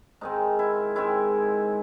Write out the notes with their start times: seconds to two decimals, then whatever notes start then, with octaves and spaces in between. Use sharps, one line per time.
0.21 G#2 D#3 G#3 C4 D#4
0.59 E4
0.96 G#2 D#3 G#3 C4 E4